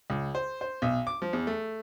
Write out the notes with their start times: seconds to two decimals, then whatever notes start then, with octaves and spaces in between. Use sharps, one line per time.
0.10 C#2
0.35 C5
0.61 C5
0.82 B1
1.07 D6
1.22 F3
1.33 E2
1.47 A3